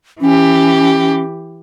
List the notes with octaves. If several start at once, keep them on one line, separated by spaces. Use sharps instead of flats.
E3 C#4 G4